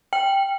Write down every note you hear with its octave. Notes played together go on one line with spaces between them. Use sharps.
G5